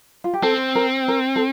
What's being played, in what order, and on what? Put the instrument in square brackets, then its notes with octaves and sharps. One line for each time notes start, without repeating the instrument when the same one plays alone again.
[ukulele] F4
G4
[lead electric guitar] C4 [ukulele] A4
[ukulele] A#4
A#4
A4